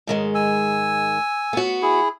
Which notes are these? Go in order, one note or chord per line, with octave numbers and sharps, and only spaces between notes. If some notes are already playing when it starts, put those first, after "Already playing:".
G#2 D#3 G#3
G#5 E6
B3 F#4
E4 G#4